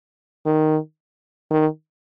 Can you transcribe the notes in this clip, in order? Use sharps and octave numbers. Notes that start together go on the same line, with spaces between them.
D#3
D#3